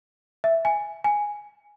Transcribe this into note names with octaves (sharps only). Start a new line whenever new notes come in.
E5
G#5
G#5